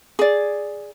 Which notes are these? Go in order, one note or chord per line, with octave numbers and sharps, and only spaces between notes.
G#4 D5